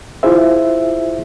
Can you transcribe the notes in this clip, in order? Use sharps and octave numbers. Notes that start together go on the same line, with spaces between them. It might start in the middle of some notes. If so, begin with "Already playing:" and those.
E4 F4 G#4 C5 E5